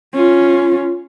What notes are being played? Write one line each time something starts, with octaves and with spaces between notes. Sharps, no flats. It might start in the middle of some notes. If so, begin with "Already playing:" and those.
C#4 F4